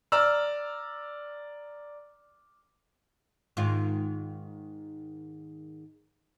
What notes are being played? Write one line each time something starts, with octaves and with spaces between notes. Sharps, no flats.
D5 A#5 E6 F6
G#2 D#3 F4